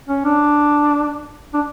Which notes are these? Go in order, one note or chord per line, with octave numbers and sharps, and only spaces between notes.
C#4
D4
D4